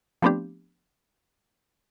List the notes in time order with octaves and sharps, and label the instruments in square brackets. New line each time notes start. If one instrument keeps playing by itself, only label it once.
[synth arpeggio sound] F3 A3 B3 C4 D4 G4